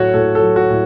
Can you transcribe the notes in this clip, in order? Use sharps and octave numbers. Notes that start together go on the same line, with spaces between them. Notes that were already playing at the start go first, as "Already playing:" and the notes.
Already playing: A2 F#3 A3 F#4 C#5
A2 A4
A4
F#3
F#4
A2